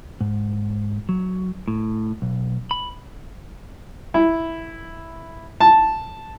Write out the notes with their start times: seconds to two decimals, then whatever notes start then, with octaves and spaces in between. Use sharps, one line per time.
0.21 G#2
1.09 F#3
1.68 A2
2.22 B1
2.71 B5
4.14 E4
5.60 A5